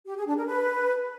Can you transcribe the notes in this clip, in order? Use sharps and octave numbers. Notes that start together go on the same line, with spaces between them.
G4
G#4
D4
A#4
B4